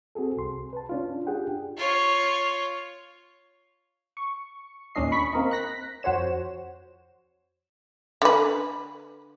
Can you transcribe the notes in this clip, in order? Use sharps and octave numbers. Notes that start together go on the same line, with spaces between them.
C4 F#4 G#4 A4
C2 C6
B4 A5
C#4 D4 F4
D4 F4 G4 G#4 F#5 G5
F4 C#5
C#6
D#2 A#2 C#4 D4 D#5 C7
B5 C#6 B6
A#3 C4 A#4 D#5
F#6 A#6 B6
F2 F#4 C5 C#5 E7
D3 B4